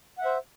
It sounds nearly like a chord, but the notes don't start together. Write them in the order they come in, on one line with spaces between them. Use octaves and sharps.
F#5 E5 C5